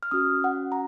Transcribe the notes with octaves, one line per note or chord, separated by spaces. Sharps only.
F6
C#4 F#4 D#6
F#5
A#5